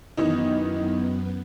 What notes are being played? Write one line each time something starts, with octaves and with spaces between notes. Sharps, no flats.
F#2 D#3 E3 B3 D#4